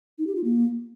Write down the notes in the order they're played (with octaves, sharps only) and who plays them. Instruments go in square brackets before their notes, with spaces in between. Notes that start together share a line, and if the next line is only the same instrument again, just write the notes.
[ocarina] D#4
G4
F4
A#3